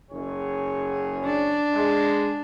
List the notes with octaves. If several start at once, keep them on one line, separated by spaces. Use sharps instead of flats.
F#1 G#4 C#5
D4
G#3